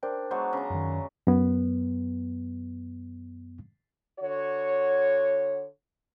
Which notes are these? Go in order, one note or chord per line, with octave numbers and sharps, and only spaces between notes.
D4 A#4 C5 G5
F#3 G#3 B3 C5 C#6
C#3 A#5
F#2 D#3
F#2 B3
D3 F#4 C#5